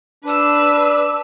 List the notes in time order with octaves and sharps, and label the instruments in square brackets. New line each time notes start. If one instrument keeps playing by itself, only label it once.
[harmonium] D4 [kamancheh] B4 E6